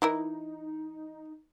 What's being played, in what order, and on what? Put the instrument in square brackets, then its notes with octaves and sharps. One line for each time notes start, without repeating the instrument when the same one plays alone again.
[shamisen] E3 E4 A#4 [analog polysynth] D#4